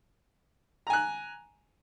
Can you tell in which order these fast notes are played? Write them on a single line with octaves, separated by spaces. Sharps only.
A#5 G#5 F#6